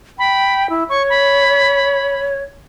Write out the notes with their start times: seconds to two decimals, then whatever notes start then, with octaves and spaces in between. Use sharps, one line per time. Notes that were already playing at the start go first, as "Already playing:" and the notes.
0.19 G5 B5
0.70 E4
0.90 C#5 C#6
1.10 B5